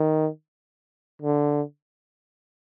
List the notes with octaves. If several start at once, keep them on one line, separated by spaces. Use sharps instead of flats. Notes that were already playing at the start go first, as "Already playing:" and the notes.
Already playing: D#3
D3